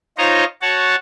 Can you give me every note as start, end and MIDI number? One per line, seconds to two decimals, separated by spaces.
0.18 0.44 63
0.18 0.44 65
0.18 0.44 72
0.18 0.44 73
0.18 0.44 75
0.18 0.44 82
0.62 0.96 66
0.62 0.96 73
0.62 0.96 78
0.62 0.96 81